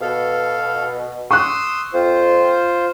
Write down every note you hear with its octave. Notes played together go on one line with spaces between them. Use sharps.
B2 A4 F5
C6 C#6 D#6 E6 F#6
F2 C4 F4 C5